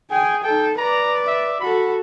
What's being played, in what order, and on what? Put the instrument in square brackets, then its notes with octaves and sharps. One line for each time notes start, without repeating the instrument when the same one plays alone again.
[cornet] G#4 [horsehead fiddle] G5 G#5
[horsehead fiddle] D#4 A4 [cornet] G5
[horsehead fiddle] B4 D5 [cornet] A#5
[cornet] E5
[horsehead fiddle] F#4 A4 [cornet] B5